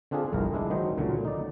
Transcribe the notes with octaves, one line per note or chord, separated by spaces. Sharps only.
D3 C4 D4 F4 G#4 G#5
G1 C2 F2 A#4
G#3 D4 E4
D#3 F#3 D#4 C5
C#2 A#2 D3 F#3
D#4 D5